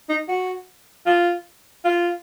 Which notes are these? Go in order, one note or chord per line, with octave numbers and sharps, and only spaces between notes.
D#4
F#4
F4
F4